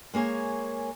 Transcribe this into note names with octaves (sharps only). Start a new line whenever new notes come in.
G#3 A#3 G#4 C#5 G#5